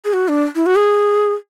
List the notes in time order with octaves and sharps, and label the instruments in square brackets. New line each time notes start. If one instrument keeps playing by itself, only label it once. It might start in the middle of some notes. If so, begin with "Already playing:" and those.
[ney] G#4
F#4
D4
E4
F#4
G#4